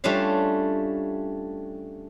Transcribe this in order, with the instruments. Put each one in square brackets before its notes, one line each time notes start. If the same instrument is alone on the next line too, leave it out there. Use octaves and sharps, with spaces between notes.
[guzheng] G3 A3 C#4 D4 F4 F5